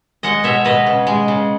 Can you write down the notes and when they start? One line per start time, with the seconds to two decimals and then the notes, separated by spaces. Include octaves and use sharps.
0.23 G#3 D#5 F#5
0.44 B2 C#5 E5
0.65 B2 B4 D#5
0.87 C#3
1.07 G#3
1.28 C#3